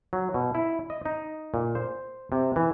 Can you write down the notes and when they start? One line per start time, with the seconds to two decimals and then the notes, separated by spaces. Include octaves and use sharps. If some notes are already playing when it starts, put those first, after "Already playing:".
0.13 F#3
0.34 B2
0.55 E4
0.90 D#5
1.06 D#4
1.54 A#2
1.75 C5
2.32 C3
2.56 E3